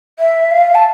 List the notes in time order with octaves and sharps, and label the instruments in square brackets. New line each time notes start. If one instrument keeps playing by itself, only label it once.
[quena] E5
F5
A5